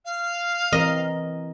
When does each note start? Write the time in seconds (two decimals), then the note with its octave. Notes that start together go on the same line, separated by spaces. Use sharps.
0.05 F5
0.72 E3 C4 A#4 D#5